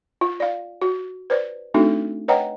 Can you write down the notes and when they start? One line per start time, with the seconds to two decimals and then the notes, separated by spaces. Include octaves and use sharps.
0.21 F4
0.40 D5 F5
0.82 F#4
1.30 B4 C5 D5
1.74 A3 C4 D4 D#4 F#4 A4
2.28 B4 C#5 D#5 F#5 G5 A#5